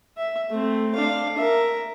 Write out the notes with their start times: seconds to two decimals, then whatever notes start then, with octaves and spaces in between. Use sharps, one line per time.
0.17 E5
0.50 A3 C4
0.95 D4 F5
1.37 A#4 E5